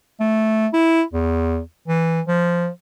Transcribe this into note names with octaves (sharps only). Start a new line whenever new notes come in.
A3
E4
E2
E3
F3